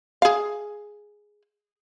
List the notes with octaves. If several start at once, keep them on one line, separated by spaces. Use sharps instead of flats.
G#4 F5